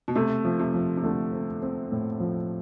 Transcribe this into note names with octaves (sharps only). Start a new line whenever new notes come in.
B2
C3 A3
F3
C3
F3
C3
D3 A3
C4
C4
A2
F3